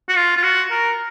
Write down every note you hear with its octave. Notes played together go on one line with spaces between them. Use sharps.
F#4
F4
F4
F#4
A#4